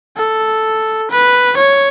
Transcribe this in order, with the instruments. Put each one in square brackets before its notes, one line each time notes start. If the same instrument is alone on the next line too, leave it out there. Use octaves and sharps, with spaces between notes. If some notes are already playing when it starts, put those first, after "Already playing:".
[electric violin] A4
B4
C#5